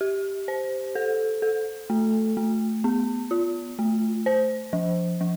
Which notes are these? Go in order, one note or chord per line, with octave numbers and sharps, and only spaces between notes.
G4
C5
A4
A4
A3
A3
B3
F4
A3
C5
F3
F3